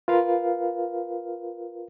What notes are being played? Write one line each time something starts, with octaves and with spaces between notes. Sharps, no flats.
F4 A#4 B4 F5